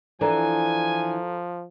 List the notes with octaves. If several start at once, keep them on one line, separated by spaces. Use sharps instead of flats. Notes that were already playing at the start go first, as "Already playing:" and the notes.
E3 F3 D4 A4 G#5 A#5